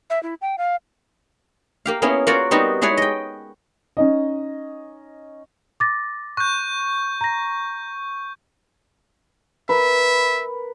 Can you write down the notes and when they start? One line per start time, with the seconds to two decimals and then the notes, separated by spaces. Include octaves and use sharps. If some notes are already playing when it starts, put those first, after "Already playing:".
0.10 E5
0.23 E4
0.42 G5
0.58 F5
1.86 A#3 G4 F5
2.02 A#3 B3 C#4 E4 G#4
2.27 A#3 F4 F#4 C#5 D5
2.51 G3 B3 C4 D#4 F#4
2.82 G#3 E4 G#4 B4 C#5 D5
2.97 D#5 G5
3.97 C#4 D#4 D#5
5.80 D6 A6 A#6
6.37 C#6 F#6 G6
7.21 A#5 A#6
9.69 A#4 B4 E5